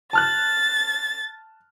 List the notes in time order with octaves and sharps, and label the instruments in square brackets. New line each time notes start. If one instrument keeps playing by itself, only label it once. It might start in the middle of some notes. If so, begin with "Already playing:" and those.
[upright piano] A5 F6 F#6 [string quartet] A6